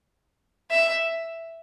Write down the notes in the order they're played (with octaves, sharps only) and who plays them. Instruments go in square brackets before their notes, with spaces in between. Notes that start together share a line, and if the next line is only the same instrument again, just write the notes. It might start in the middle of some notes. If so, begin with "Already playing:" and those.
[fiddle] E5